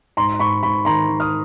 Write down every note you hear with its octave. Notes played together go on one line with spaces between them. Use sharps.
G#2 A#5 C6
G#2 B5 C#6
G#2 B5 C#6
D#3 A#5 C6
D#3
D#6 F6